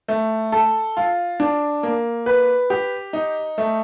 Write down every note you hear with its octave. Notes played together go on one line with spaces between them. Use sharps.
A3
A4
F4
D4
A#3
B4
G4
D#4
A3